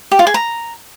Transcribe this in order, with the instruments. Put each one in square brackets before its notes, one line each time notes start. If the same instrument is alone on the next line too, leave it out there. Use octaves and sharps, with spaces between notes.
[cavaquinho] G4
F4
G#4
A#5